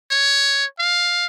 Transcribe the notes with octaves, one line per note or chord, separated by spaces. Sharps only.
C#5
F5